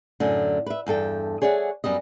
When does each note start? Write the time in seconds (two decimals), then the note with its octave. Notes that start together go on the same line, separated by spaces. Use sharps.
0.20 F#2 A2 D3
0.66 B4 E5
0.87 E2 G2 A4 G5
1.42 G#4 C#5 D5 E5 F#5
1.84 F#2 G3 B3 D#5